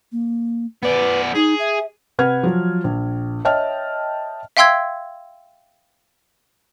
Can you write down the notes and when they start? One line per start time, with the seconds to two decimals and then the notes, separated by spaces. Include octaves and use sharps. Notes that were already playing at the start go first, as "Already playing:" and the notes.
0.12 A#3
0.83 B3 B4 D5
1.35 D#4 G#4
1.59 E5
2.19 C3 B4 F#5 F6 G#6
2.43 F3 F#3
2.84 A#1
3.45 C#5 D#5 E5 G5 A5 F6
4.57 E5 F5 G5 C6 E6 G#6